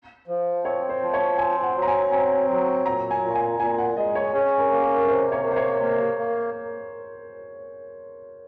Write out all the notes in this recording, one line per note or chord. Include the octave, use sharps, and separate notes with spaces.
F3
C4 C#5
C5
F3
C#5
C4 G#5
F#5
F#3
A#5
G#5
C4 G#5
F#3
A#2 A#5
G#5
A#2
G#5
A#2 G#5
F#5
G#3 D#5
C#5
C#4 G#4
A#4
A#3
A#4
C3 C5
C#5
A#3
C5
C#5
A#3
A#3